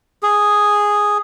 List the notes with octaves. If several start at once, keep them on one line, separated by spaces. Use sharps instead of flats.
G#4